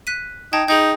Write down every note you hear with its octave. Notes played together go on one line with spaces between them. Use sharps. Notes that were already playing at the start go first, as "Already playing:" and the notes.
F#6 B6 D#7
D#4 G5 A5 G#6
D#4 G#4 G5 G6